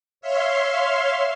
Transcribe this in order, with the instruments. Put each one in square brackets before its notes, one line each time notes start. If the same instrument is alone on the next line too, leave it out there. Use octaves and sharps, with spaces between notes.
[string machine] C#5 E5 F5 C6